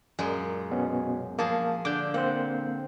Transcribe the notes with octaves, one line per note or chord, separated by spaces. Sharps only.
F#2 A#2 G#3
B2 B3 C#4
F3 A#3 G#4 A5
D3 D6 G6
A#3 C4 C5 F#5